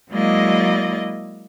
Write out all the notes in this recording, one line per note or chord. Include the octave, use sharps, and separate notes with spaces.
F#3 G#3 A#3 E4 D5 D#5